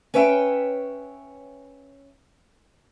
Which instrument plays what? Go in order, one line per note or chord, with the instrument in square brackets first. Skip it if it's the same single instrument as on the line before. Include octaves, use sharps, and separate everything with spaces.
[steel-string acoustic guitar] C#4 B4 C#5 E5 G5